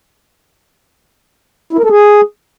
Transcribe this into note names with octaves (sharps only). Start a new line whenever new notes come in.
E4
A#4
A4
G#4